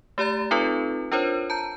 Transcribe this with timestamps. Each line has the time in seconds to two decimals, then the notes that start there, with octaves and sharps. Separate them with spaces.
0.18 A3 G4 D5 A#5 A6
0.51 C4 D#4 F4 A4 B4
1.12 D4 F4 A#4 C5 C#5
1.50 A5 A#5 G6